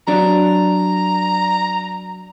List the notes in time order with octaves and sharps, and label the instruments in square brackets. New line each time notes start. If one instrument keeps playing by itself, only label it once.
[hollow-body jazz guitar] F#3 D4 [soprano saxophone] A#5